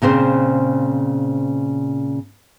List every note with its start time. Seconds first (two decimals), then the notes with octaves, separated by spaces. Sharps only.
0.02 A#2 C#3 C4 C5